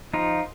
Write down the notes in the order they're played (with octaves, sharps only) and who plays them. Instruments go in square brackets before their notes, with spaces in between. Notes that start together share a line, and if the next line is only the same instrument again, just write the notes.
[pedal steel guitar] F3 D#4 F4